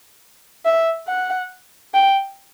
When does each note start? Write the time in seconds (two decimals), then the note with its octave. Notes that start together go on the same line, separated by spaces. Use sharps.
0.65 E5
1.08 F#5
1.94 G5